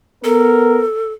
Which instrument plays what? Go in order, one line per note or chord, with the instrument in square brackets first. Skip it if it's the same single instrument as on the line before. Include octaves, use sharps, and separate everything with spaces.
[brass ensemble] B3 A#4 [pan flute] A4